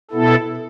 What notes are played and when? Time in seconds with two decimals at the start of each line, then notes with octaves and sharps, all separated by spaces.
0.11 B2 B3 E4 A4